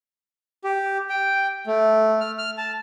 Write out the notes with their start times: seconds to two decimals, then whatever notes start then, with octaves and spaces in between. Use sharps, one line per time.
0.64 G4
1.09 G5
1.67 A3
2.21 F6
2.38 F6
2.58 A5